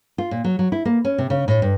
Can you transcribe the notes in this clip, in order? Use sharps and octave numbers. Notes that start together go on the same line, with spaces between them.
F4
A#2
F#3
F#3
E4
A#3
C#4
C3
C#3
A2
G2